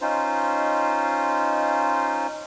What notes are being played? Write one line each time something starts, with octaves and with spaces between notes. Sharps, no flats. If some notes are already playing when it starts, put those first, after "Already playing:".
C#4 D#4 F4 C5